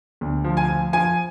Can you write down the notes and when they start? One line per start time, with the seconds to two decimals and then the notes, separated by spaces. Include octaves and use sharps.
0.21 D2
0.44 F3
0.57 G#5
0.69 F3
0.93 F3 G#5